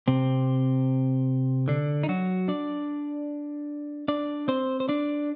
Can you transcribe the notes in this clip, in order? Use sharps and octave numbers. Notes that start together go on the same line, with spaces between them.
C3 C4
D3 D4
D#4
F#3 F#4
D4 D5
D4 D5
C4 C5
C5
D4 D5